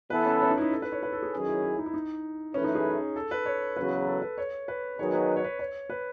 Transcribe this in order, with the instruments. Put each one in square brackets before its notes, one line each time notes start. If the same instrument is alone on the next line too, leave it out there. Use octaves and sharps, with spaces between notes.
[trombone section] E3 B3 E4 A4 [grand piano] B4
[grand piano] C#4
C#4
D#4
E4
D#4
A4
B4
C#5
B4
A4
G#4
[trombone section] D#3 F#3 C#4 G#4
[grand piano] E4
E4
D#4
E4
D#4
[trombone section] F#2 E3 A3 E4 B4 [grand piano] C#4
[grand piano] D#4
G#4
A4
B4
C#5
[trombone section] E2 C#3 F#3 [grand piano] B4
[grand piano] A4
B4
C#5
B4
[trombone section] D#3 F#3 B3 D#4 G#4 [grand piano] C#5
[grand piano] B4
C#5
B4
C#5
B4